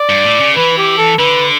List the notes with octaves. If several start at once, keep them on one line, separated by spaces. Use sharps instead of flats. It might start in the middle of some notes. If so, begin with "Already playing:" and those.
Already playing: D5
G2
A2
C#3
E3 B4
G4
A4
D3 B4